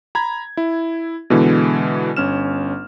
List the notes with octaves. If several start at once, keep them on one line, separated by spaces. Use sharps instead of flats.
A#5 B5 G#6
E4
B2 D3 E3 G#3
G1 C#4 F6 E7